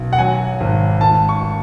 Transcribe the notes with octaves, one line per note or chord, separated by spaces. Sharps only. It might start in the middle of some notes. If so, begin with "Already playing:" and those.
Already playing: B1
F#5
F#3 G#5
G#1
G#1 A5
C#6